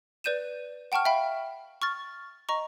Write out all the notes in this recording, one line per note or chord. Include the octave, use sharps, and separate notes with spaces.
B4 D5 G6 D#7 E7
F#5 G5 A5 C#6 F6
E5 F5 G5 B5
C#6 F6 A6
D#5 A#5 C#6